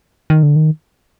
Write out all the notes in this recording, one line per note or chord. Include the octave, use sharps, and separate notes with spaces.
D#3
D3
D#3